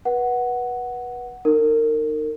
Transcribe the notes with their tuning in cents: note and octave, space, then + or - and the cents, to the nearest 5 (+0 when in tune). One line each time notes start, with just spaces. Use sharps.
B4 -25 F#5 +0
D#4 -15 A#4 -30